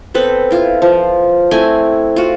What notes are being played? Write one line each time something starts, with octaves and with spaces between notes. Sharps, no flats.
B3 C4 A4 B4
E4 F4
F3
A3 C4 E4 G#5
F4 F#4